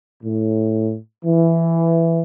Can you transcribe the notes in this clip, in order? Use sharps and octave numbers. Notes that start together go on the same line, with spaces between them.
A2
E3